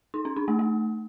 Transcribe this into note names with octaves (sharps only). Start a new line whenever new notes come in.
D#4
C#4
D4
A3
A3